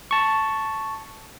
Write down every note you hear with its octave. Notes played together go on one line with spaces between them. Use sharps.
A5 C#6